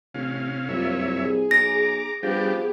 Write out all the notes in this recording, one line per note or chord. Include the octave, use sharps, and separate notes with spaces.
A1 C3 C#4 F5
C2 F#2 A#3 F4 C#5 E5
G#4
B1 A#5 D6 A#6
F3 G3 B3 D4 G4 G#4 G5